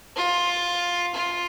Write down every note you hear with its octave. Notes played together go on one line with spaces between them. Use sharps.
F4
F4